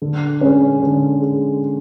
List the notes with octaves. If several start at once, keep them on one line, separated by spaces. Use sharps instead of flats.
D3
G#3 C#4
D3
G#3